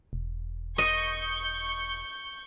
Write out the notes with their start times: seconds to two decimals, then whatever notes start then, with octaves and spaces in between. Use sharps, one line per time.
0.13 E1
0.78 D#5 C#6 G6